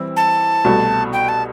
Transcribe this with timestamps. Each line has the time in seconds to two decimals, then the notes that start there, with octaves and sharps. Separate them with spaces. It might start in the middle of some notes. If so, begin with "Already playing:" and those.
Already playing: E3 G3 C4 E4
0.16 A5
0.65 C2 B2 A3
1.13 G5
1.28 A5